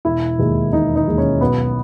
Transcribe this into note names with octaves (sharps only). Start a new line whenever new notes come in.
E1 E4
D#2 D#3 G#3
E1 D#4
D#4
D#2 D#3 G#3
C#4
B1 B3